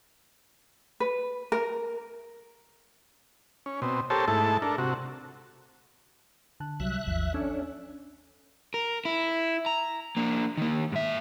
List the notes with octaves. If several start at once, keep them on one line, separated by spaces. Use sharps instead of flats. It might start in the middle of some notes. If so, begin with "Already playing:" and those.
B4
A#4
C#4
B2 C4
G4 A4 A#4 C5 C#5 A5
G#2 A3 E4 A4 A5
D4 A4 A#4
C3 F#4
D3 A5 F#6
C2 F#3 G3 E5 F#6
G#1 D#2 F3
C#4 D4 A4 E6 G#6
A#4
E4
A#5
A#3 D4
D#3 A#3
G#2 E5